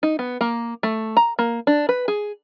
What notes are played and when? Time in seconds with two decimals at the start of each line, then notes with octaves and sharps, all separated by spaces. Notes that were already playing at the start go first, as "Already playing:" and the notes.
0.03 D#4
0.19 B3
0.41 A#3
0.83 A3
1.17 A#5
1.39 A#3
1.67 D4
1.89 B4
2.08 G#4